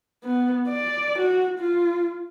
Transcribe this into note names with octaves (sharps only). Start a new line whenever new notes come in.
B3
D5
F#4
F4